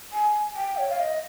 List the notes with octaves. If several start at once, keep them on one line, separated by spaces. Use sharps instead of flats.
G#5
G5
C#5
F5
D#5